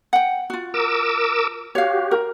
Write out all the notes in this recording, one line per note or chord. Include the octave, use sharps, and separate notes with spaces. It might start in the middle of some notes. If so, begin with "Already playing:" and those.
F#5 G5
F4 F#4
A#4 D6 E6
F#4 G4 C#5 F5
A#4